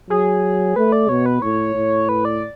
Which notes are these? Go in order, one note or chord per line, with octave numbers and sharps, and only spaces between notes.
F#3 G#4
A3 B4
D5
B2 C#5
B4
A2 C#5
A2
B4
D5